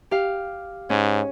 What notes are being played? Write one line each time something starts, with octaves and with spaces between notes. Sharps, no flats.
G4 F5
G#2 C#4